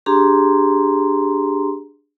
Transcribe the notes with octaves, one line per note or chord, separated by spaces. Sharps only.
D4 G4 G#4 A#5 C6